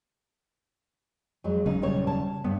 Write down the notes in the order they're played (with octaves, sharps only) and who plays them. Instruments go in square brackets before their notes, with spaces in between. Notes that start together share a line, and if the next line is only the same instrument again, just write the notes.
[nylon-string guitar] F2 F#3 G#3
[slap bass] E1 C#3 F#3 [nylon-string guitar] D#4
[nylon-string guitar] A#2 G3 C#5
C#5 A5
[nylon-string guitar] G2 [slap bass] B3